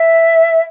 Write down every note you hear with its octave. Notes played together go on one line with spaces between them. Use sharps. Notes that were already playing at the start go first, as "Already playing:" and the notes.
Already playing: E5